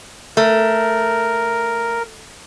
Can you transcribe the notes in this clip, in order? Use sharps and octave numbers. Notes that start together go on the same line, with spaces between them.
A3 A#4